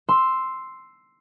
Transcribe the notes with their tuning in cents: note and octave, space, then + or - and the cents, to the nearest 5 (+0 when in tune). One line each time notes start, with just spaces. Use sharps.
C6 +0 E6 +0